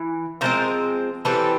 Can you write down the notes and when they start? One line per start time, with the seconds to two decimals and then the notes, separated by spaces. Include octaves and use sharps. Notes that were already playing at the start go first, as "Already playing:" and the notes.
Already playing: E3
0.41 D3 F3 G#3 C4 A#4 C5
1.25 E3 G3 C4 A4 B4